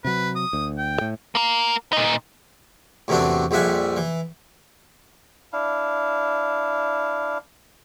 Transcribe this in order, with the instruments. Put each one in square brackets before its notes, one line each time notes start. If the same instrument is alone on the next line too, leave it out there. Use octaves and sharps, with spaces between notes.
[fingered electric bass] C3 F#3 [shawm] B4
[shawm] D#6
[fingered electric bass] D2
[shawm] G5
[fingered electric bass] A2
[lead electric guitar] A#3 A#4
A#2 D#4
[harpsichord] E2 A2 C3 F#3 C4 D4
A#1 F2 G3 E5 F#5 G#5
E3
[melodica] D4 E4 F5